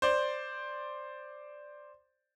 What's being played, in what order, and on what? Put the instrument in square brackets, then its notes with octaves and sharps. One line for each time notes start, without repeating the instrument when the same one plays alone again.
[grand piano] C5 D5